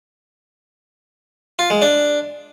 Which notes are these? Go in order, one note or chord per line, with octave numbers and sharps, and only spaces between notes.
F4
G#3
D4